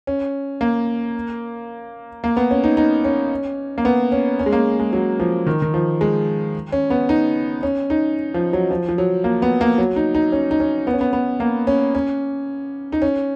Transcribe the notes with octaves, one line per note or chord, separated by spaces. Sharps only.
C#4
A#3
A#3
B3
C#4
D#4
D#4
C#4
A#3
B3
C#4
C#4
G#3
A#3
G#3
F#3
F3
D#3
D#3
F3
G#3
C#4
B3
D#4
C#4
D#4
F3
F#3
F3
F3
F#3
A#3
B3
A#3
F#3
D#4
D#4
C#4
D#4
C#4
B3
C#4
B3
B3
A#3
C#4
C#4
D#4
C#4